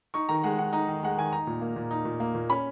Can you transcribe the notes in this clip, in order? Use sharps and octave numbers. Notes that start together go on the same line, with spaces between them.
D#4 C#6
D#3 A#5
G#3 F#5
D#3 F#5
D#4 A#5
D#3
G#3 F#5
D#3 G#5
D#4 A#5
A#2
A#3
A#2
D#4
A#2
A#3
A#2
C#4 B5